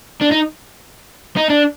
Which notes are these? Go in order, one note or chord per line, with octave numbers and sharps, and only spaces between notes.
D4
D#4
D#4
D4